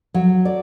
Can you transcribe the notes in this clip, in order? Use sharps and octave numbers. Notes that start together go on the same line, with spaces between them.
F#3
D5